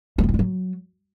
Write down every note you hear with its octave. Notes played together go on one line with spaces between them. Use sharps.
A3
B3
E4
G3
F#3